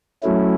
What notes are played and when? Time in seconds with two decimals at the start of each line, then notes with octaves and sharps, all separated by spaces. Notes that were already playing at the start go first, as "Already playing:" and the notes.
0.23 F#3 A3 C#4 E4